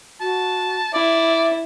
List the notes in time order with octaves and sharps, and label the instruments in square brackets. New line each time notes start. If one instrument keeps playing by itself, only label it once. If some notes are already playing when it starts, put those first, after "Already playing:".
[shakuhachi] F#4 [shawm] A5
[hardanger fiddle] E4 [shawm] D5 [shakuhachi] E5